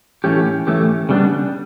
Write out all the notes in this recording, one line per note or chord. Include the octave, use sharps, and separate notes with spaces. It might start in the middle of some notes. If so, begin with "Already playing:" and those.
A2 E3 A3 C#4 G4
A2 E3 A3 C#4 G4
C#3 G3 B3 D4